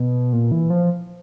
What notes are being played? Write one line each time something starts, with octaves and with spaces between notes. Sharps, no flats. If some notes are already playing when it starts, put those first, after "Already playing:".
Already playing: B2
A#2
E3
F3